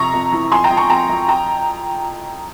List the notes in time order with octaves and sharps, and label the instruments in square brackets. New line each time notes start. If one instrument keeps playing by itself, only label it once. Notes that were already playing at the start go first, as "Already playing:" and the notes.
Already playing: [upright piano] F2 C3 A#5 C#6
F2
E3
F2 G#5 C6
G5 A#5
F2
A#5 C#6
F2 G5 A#5
F2
G5 A#5